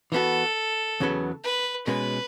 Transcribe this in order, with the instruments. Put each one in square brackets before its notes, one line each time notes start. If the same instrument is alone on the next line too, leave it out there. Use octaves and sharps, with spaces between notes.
[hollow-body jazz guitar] E3 B3 F#4 [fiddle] A4
[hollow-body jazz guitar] E2 C#3 F#3 B3 F#4
[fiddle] B4
[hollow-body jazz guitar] B2 G#3 C#4 [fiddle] B4